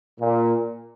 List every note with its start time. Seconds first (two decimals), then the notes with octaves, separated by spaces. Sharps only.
0.20 A#2